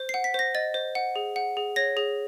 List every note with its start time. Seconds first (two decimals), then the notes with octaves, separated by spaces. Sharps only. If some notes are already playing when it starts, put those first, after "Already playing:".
Already playing: C5
0.09 F#5 C7
0.24 B6
0.34 C5 A#6
0.55 D#5 A6
0.74 C5
0.95 F#5
1.16 G#4
1.36 F#5
1.57 G#4
1.76 C#5 A#6
1.97 G#4